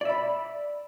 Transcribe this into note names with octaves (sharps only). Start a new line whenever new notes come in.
D5 E5 B5